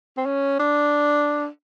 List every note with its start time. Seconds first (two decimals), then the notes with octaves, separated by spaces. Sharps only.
0.17 C4
0.26 C#4
0.59 D4